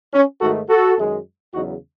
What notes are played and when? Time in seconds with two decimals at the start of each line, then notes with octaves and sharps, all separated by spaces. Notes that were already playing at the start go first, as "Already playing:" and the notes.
0.13 C#4
0.40 G#2 D#3 A3 F#4 A4
0.68 F#4 A4
0.96 F#2 D#3 G#3
1.53 E2 C#3 F#3 D#4 F#4